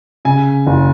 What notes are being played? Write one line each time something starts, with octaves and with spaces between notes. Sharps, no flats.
C#3 G#5
F#1